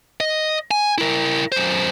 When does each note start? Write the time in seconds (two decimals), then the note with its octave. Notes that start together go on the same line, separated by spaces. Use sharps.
0.20 D#5
0.71 G#5
0.98 E4 A#4
1.52 F#2 C5